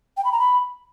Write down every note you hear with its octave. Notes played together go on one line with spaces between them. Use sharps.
G5
B5
A#5
B5